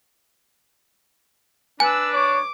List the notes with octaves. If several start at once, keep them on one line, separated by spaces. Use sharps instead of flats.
D4 B4 G#5 E6
C#5 D6